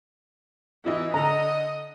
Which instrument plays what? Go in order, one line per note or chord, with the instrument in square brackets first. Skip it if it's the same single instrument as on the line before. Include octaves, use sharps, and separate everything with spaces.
[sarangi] E3 [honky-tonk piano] D#4 E4 D#5
[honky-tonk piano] D3 [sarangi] D#5 [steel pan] A#5